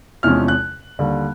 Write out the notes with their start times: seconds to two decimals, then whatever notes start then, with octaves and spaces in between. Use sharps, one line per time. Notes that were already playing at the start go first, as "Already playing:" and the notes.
0.23 E2 C3 F3 G#3 C#4 F6
0.48 F#6
0.99 D#2 D3 G3